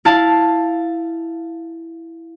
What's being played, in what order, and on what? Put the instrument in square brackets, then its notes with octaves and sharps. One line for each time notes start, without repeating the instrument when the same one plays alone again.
[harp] E4 F5 A5